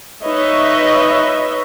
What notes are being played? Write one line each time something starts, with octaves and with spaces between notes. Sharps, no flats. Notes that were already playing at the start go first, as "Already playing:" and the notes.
D#4 B4 C#5 D#5 E5